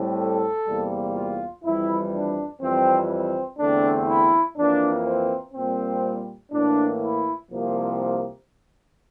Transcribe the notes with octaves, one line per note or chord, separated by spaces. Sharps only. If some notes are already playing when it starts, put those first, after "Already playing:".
Already playing: A2 G3 C4
A4
E2 C3 G3 A#3
F4
F2 E3 G3 E4
D4
F2 E3 G3 C4
C4
E2 D3 A3 C4 D4
E4
F2 E3 A#3 D4
C4
A#2 G3 A#3 C4
A2 E3 A#3 D4
E4
C2 C3 F3 A#3